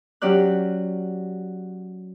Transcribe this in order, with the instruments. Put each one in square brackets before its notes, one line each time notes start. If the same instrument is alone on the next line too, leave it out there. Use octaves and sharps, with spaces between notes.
[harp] F#3 C#4 G4 D5 F#6